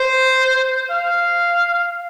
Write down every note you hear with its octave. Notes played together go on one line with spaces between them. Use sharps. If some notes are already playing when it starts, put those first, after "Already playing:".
Already playing: C5
F5